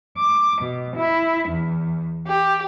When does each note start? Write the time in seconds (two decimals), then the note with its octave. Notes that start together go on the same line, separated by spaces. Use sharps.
0.19 D6
0.63 B2
0.97 E4
1.50 E2
2.27 G4